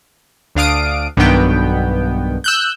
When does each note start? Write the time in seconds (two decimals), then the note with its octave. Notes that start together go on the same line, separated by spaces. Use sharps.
0.55 D2 D4 F5 D#6 D7
1.17 B1 G2 B2 D#3 B3 G5
2.44 E6 F#6 G6